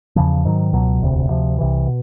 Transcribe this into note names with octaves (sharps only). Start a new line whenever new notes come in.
E2 C#3 F3
G#2 D#3 F#3
C#2 B2 F#3
E1 D2 C3
D2 C3 F3
C2 C3 E3
B2